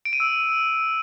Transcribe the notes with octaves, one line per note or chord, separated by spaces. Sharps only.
D7
D#7
E6